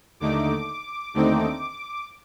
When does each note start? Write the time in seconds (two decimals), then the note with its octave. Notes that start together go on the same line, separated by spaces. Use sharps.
0.20 D#2 D3 A3 D#4 D6
1.14 D#2 D3 A3 C4 D#4